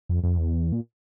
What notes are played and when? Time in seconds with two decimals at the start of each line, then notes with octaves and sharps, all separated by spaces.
0.09 F2
0.24 F2
0.38 E2
0.72 A#2